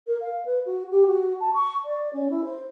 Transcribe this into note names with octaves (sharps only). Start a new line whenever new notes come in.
A#4
F5
B4
F#4
G4
F#4
A5
C#6
D5
C#4
E4
C5